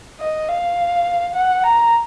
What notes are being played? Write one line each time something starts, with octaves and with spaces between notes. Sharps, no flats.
D#5
F5
F#5
A#5